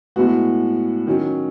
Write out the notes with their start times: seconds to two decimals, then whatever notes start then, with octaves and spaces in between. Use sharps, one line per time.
0.16 A2 G#3 B3 F#4
1.07 D#3 F#3 C#4